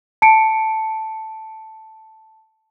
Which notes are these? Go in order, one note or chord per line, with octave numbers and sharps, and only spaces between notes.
A5 C#7 D7